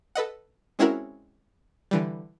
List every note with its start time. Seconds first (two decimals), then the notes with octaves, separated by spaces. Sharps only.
0.15 A4 B4 D#5 F#5
0.79 G#3 C4 C#4 E4 F#4 A#4
1.91 D3 E3 G3